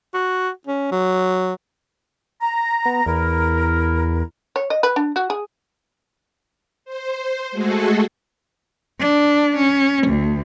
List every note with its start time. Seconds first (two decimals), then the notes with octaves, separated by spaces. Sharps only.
0.14 F#4
0.67 C#4
0.92 F#3
2.41 A#5
2.85 B3
3.06 E2 E4 A#4
4.56 C#5
4.70 D#5
4.83 B4
4.96 D4
5.16 F#4
5.30 G#4
6.85 C5
7.52 G#3 A3 F#4 G#4 A4
8.99 D4
9.57 C#4
10.07 D2